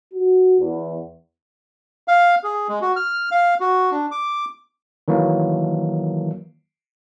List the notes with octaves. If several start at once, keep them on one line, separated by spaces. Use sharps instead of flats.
F#4
E2
F5
G#4
G#3
F#4
F6
F5
F#4
D4
D6
D#3 E3 F#3 A#3